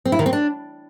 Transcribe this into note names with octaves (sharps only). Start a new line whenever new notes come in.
C4
E4
D#3
C4
D4